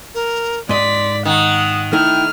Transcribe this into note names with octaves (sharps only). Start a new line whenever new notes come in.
A#4
G#2 D5 D#5 C6 B6
D#3 F#5 D#6
A3 D#4 E4 G5 F6